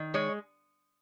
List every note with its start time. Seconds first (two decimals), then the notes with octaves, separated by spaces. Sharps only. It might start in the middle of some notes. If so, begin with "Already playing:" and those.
Already playing: D#3
0.14 G#3 C#5